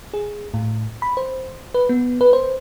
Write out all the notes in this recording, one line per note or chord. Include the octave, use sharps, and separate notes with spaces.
G#4
A2
B5
C5
B4
B3
B4
C5